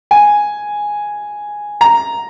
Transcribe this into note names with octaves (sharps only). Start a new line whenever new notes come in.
G#5
A#5